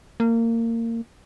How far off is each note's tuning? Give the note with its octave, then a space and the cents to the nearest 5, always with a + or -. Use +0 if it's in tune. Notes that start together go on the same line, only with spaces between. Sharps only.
A#3 -25